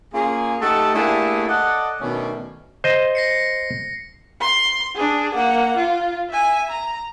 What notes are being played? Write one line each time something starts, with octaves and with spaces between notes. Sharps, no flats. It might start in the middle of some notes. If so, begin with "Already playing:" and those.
A#3 C#4 F4 G#4
A3 D#4 G4 A4 F#5 A5
A3 A#3 D4 E4 G4 G#4
A4 D5 D#5 F#5
B2 D#3 A3 C#4 D4
C5 D#5
A#6 C7 C#7
C6
D4 G#4
A#3 F#5
F4
E5 G#5
A#5